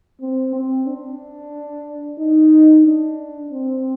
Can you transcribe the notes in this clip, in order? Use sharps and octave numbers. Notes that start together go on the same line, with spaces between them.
C4
C4
D4
D#4
D4
C4